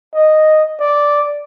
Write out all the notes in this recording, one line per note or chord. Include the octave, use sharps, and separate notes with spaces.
D#5
D5